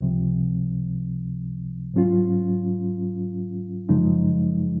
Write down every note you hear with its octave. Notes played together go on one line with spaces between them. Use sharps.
C#2 C3 F3
G#2 F#3 C#4 F4
F#2 C#3 F3 G#3 D#4